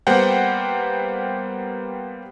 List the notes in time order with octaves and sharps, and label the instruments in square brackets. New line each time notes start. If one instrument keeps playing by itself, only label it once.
[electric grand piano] G3 A#3 B3 C5 F#5 G5